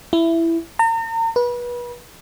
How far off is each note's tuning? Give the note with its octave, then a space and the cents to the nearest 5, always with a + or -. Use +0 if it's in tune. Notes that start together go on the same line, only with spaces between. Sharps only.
E4 +10
A#5 -40
B4 -30